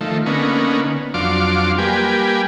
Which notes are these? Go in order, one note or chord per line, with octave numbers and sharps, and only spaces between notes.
D#3 F3 A3
D3 A#3 B3 C#4 D#4
F2 F#3 D4 F5 C6 D6
G3 A#3 G4 B4 G#5